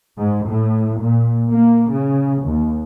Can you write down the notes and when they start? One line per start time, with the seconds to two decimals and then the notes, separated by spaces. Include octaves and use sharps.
0.18 G#2
0.48 A2
1.00 A#2
1.51 A#3
1.93 C#3
2.45 D#2